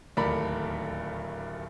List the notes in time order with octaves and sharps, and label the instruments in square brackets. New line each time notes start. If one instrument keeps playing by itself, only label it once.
[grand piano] D1 D#2 A3 A#4 D5 B5